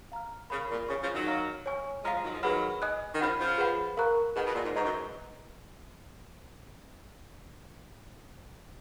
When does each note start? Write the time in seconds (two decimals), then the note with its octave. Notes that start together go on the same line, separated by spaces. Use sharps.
0.12 F5 A#5 F6
0.50 C#3 A#4 F5 B5
0.70 A#2
0.89 C#3 C#5 G#5 C#6 F6
1.02 C#3 F3
1.15 D#3 F#3
1.27 F5 A#5 F6
1.66 C#5 G#5 C#6 F6
2.04 F3 G#3 F5 A#5 F6
2.14 F3 G#3
2.24 D#3 F#3
2.33 F3 G#3
2.43 D#3 F#3 G#4 B4 F#5 B5 F6
2.82 D#5 G#5 D#6 F#6
3.14 D#3
3.20 C#3 F3 F#5 B5 F6
3.39 C#3 F3
3.58 G#4 B4 F#5 B5
3.97 A#4 F5 A#5 C#6 F#6
4.35 B2 D#3 G#4 B4 F#5
4.46 B2
4.55 A#2
4.64 G#2
4.75 G#2 B4 D#5 A#5 C#6
4.84 F#2